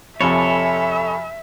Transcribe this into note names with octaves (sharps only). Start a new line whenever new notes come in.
F2 C3 A4 C#5 E5 G#5 B5